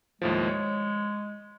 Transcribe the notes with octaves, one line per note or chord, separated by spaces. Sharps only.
D#2 A2 F3 G#3
C#5